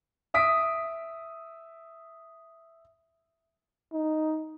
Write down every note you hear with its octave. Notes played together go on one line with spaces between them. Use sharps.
E5 D#6 B6 D7
D#4